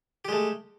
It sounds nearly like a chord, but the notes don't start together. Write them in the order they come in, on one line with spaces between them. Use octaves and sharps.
G4 G#3 A3